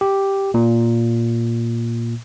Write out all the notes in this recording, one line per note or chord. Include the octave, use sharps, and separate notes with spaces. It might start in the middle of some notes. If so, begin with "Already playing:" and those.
G4
A#2